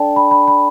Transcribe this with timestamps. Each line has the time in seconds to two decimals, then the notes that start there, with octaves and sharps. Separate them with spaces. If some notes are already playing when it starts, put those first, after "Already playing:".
Already playing: D4 A4 D5 G5 A5
0.16 B5
0.31 B5
0.48 B5